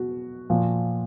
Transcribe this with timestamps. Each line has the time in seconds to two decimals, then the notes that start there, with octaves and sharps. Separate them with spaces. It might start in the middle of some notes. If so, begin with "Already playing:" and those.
Already playing: B2 F#4
0.50 A#2 F3